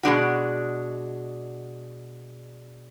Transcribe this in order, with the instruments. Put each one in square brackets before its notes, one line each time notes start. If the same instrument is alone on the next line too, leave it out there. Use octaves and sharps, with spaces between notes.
[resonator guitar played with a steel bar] B2 G#3 D4 F#4